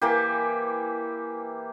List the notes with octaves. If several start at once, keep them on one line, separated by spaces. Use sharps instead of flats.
E3 A#3 G4